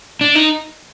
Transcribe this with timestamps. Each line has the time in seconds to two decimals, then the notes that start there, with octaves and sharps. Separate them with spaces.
0.21 D4
0.35 D#4